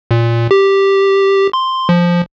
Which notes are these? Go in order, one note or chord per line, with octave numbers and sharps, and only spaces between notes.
A#2
G4
C6
F3